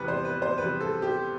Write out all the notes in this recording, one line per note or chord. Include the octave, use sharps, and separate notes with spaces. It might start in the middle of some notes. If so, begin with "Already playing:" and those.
Already playing: E2 C3 G3 B3 B4
C5
B4
C5
E2 C3 G3 B3 B4
A4
G4